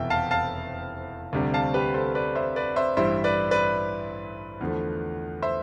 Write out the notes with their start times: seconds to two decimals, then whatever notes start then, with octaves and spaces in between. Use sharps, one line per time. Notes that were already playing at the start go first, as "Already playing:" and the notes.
Already playing: F1 E2 B2 B3 E5 G5
0.10 F5 A5
0.31 F5 A5
1.33 D2 C3 G3 D4
1.54 F5 A5
1.74 G4 B4
1.94 A4 C5
2.15 B4 D5
2.35 C5 E5
2.56 B4 D5
2.76 C5 E5
2.97 A1 G2 E3 G3 C5 E5
3.24 B4 D5
3.51 B4 D5
4.61 E2 D3 F3 A3
5.42 C5 E5